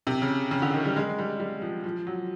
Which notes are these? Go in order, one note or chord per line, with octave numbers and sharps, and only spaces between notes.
C3
C#3
C#3
D3
D#3
G3
G#3
G3
G3
F3
F3
F#3